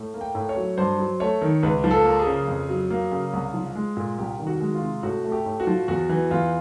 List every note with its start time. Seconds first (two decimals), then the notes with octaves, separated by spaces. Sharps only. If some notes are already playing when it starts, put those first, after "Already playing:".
Already playing: A2
0.14 A#3
0.21 G5
0.35 A2
0.49 C#5
0.56 F#3
0.78 G2 C5
0.99 F#3
1.20 A3 C#5
1.41 D#3
1.63 C#2 B4
1.84 F3
1.91 A4
2.05 A#3
2.19 G#4
2.27 C#3
2.48 F2
2.69 F#3
2.90 A#3
3.12 C#3
3.33 C2
3.54 F3
3.75 G#3
3.97 A#2
4.18 C2 G4
4.39 D#3
4.47 F#4
4.60 G#3
4.75 F4
4.82 C3
5.03 A2 F#4
5.25 A3
5.32 G4
5.46 A2
5.60 F#4
5.67 F3
5.88 E2 F#4
6.09 E3
6.31 E2 F4